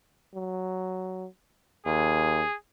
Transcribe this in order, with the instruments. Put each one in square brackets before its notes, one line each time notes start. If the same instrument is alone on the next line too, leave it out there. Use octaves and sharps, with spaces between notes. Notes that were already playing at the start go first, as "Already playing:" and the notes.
[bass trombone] F#3
[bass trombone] D#2 [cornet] G#4